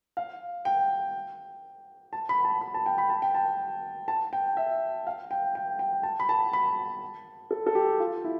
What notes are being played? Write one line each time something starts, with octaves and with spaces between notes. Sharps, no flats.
F5
G5
A5
B5
A5
B5
A5
G5
B5
A5
G5
A5
A5
G5
E5
F5
G5
G5
G5
A5
B5
A5
B5
A4
A4
G4
F4
E4